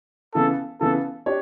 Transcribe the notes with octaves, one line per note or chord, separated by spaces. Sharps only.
C#3 E3 B3 A4
C#3 E3 B3 A4
D4 G4 C#5